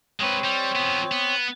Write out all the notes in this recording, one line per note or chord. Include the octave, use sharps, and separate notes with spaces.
G#3 C4 B4 C#5
G3
F3 B3
B3